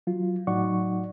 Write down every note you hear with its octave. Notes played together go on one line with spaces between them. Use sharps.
F#3 F4
A2 F#3 D#4 D5 F#5 C#6